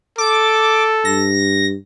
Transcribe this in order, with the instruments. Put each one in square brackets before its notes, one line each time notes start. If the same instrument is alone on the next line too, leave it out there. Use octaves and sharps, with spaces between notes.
[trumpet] A4 [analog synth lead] D6
[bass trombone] G2 [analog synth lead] A#6